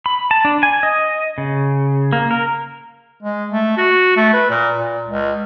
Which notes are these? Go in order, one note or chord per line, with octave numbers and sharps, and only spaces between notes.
B5
A5
D4
G#5
D#5
C#3
A#3
A#4
G#3
A3
F#4
A3
B4
A#2
A#2
C#2